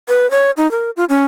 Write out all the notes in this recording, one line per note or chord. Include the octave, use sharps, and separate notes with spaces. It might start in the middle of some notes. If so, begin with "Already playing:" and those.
B4
C#5
D#4
A#4
F4
C#4